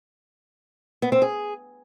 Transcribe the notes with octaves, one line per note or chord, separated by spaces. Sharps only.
B3
C4
G#4